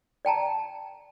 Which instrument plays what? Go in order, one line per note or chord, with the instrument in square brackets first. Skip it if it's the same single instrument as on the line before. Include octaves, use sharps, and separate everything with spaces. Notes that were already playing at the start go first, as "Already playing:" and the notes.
[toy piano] D5 G5 A5 A#5